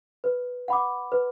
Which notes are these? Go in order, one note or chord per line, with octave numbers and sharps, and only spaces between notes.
B4
F#5 B5 D6
B4